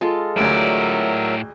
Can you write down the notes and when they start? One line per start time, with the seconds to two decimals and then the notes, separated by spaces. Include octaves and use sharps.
0.01 G#3 F4 A4
0.36 A1 D2 A2 F#3 A#4 D5 E5